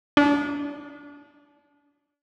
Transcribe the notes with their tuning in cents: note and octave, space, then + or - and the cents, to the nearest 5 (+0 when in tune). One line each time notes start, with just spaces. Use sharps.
D4 -30